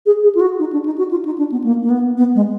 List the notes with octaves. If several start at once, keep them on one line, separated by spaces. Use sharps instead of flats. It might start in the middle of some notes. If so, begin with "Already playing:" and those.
G#4
G#4
F4
F#4
D#4
D4
D#4
F#4
F4
D#4
D4
B3
A#3
A#3
B3
B3
G#3